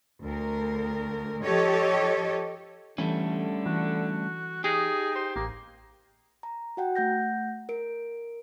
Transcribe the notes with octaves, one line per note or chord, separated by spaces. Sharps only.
D2 A#4
F3 G4 A4 C#5 D#5
D3 E3 G3 A3 C#4
E3 F#4
D#4 G4 G#4
C5
A1 A#3
A#5
F#4 F#5 G5
A3 F#5 G6 A#6
A#4 D7